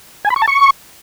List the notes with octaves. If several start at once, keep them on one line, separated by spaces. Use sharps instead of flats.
G#5
B5
C#6
A5
C#6